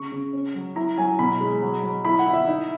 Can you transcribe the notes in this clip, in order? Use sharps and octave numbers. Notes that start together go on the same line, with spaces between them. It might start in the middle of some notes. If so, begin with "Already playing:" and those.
Already playing: C#3 C#6
C#3
C#4
F#3
E4 A#5
F#3 G#5
B2 B5
G#3
F#3
F#3
E4 B5
F#5
E4
E5
D#4